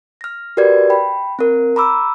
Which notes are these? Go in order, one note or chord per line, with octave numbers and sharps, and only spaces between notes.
F6 A#6
F#4 G4 A#4 B4 D5 G#6
G5 B5
C4 A#4
A#5 B5 D6 E6